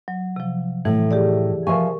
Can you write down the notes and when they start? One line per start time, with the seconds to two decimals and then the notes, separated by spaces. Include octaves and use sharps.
0.08 F#3
0.36 C3 F3
0.85 A2 E3
1.11 G4 G#4 D5
1.67 F3 A#4 E5 G#5 C#6